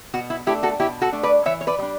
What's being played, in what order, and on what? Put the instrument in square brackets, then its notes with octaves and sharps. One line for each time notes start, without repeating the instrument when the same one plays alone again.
[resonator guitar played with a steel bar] B2 F#4
E4
A3 D4 E4 G4
F#4 A4
B2 E4 G4
F#4 A4
A3 D4
B4 D5
E3 C#5 E5
C#5
B4 D5
G3 D4